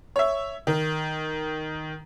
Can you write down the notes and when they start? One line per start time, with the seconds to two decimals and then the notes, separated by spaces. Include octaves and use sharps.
0.16 C#5 E5
0.67 D#3